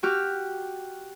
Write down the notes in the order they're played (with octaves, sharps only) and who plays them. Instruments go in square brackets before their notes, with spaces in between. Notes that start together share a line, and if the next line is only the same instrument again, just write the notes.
[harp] F#4 G4 F6